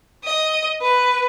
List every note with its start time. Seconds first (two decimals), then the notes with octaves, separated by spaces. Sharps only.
0.24 D#5
0.82 B4